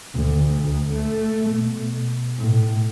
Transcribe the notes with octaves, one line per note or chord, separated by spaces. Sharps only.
D2
D2
A3
B2
A2